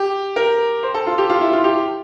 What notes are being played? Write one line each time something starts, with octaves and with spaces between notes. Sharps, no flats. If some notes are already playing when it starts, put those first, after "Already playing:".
Already playing: G4
A#4
C5
A4
F4
G4
F4
E4
F4
G4